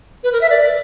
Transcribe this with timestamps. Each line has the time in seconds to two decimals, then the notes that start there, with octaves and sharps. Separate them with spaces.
0.24 B4
0.32 A#4
0.41 E5
0.50 D5